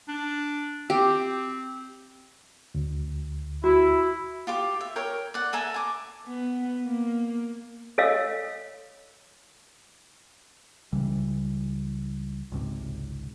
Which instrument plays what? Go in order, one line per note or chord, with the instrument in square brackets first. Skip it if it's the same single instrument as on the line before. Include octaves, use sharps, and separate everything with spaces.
[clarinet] D4
[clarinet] C4 [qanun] G4
[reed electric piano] D2
[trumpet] E4 [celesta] F#4
[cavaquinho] F4 G4 D6
E5
A#4 C#5 G5
D5 F#5
A4 E5 G#5 A#5
G#5 D6
[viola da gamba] B3
A#3
[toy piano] A4 C#5 D#5 F5 E6
[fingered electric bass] C#2 C#3 E3 G3
G#1 C#2 C3